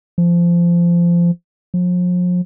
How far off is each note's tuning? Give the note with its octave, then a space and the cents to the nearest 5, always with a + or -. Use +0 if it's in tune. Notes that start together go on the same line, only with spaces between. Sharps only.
F3 -20
F3 +40